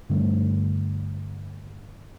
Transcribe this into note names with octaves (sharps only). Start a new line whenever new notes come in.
G2 D3 G3 A3